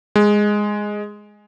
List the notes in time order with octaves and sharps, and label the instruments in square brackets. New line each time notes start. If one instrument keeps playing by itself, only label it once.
[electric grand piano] G#3